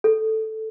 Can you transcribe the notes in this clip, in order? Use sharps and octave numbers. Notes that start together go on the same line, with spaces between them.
A4